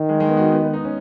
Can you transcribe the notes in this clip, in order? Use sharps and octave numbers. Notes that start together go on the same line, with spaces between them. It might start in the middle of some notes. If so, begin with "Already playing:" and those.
Already playing: D#3
G#3
G#3
B3
F#4
D#4
B3
B3
D#4
C#4